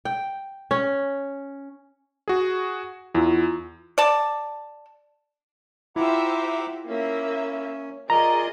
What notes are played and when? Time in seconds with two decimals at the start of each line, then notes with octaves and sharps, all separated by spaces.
0.05 G5
0.71 C#4
2.28 F#4 G#4
3.15 E2 E4 F4
3.98 D5 A5
5.96 E4 F4 G4 C5 E5 F#5 A#5 D6
6.88 A#3 C#4 E5
8.10 F4 G#4 A#4 D5 D#5 A#5